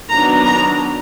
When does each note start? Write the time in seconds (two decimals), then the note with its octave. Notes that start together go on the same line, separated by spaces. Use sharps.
0.10 D#3 F#3 B3 D4 A#5
0.45 A#5